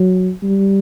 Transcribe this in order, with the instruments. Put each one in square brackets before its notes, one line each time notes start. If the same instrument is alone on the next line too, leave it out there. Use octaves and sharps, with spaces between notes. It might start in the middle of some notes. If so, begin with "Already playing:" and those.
Already playing: [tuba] F#3
G3